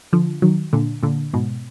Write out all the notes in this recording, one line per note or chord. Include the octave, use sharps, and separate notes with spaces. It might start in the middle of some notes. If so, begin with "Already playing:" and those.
D3 F3
D#3 F#3
A#2 D3
A#2 D3
G#2 B2